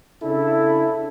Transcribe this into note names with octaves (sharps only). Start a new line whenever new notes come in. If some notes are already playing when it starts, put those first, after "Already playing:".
C#3 D4 E4 A4